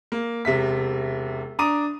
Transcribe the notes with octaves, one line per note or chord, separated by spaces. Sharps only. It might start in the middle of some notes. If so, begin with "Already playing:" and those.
A#3
E1 C3 E5 B6
D4 A#5 D6 D#6 D#7